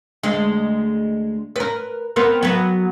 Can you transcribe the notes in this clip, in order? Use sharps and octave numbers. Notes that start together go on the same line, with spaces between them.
D2 G#3
A#4 B4
B3 C4 A#4
F#3 B3